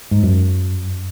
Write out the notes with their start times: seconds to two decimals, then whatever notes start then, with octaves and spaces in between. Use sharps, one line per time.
0.11 G#2
0.23 F#2